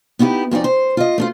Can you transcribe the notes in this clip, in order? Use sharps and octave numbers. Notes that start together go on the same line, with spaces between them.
B3 D#4 E4 F#4 G4
F2 A#3 C#4 D#4 D5
C5
F4 D#5
A3 D4 F4